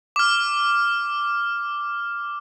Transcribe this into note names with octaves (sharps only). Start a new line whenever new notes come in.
D6 F6